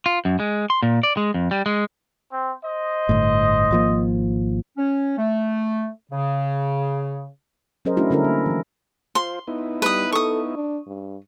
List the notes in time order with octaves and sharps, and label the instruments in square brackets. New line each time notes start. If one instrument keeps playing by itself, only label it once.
[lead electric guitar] F4
F#2
G#3
C6
A#2
D5
G#3
F2
G3
G#3
[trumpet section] C4
C5 D#5
[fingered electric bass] G1 A2
G#1 F3 A#3
[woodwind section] C#4
A3
C#3
[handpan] F#3 C#4 G#4 A#4 C5 D#5
A3 C#4 D4 E4 F#4
D3 G3 C#4 E4 A4 A#4
A#3
E3 F3
[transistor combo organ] F4 C5 [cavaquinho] C6
[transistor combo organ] B3 D#4 E4
[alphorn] G3 [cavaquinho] B4 D#6
[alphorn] A4 [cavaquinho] C#6 D#6
[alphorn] D4
G2